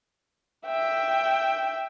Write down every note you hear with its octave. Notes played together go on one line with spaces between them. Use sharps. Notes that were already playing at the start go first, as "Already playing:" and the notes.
E5 G5